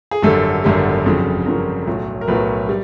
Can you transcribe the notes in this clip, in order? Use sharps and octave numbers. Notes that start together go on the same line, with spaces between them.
G#4
G#1 F#2 D3 G3 A4
G#1 F#2 D3 G3
G1 F2 C#3 F#3
G1 F2 C#3 F#3 A#4
B1 A2 F#3
A#4
B1 A2 F#3 B4
G3